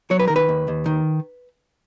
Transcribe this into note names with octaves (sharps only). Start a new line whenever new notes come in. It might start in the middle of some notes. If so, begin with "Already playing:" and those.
F#3 C#5
B4
D#3 A#4
B4
D#2
D#2
D#3